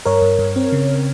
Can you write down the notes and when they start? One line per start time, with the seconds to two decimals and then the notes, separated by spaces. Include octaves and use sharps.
0.06 G2 A#4 C#5
0.22 G2
0.39 G2
0.56 C4
0.72 C#3